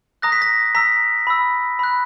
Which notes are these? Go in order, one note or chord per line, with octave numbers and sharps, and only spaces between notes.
A#5 D#6 F#6 A#6
B6
A#6
A#5 E6 B6
B5 E6
B5 F#6